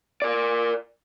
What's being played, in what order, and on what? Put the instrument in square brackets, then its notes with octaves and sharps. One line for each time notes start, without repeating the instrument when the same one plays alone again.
[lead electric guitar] A#4 D5